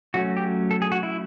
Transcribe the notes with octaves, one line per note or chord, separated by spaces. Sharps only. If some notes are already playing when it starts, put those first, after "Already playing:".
F#3 A3 C#4 F#4
G4
A4
G#4
F#4
E4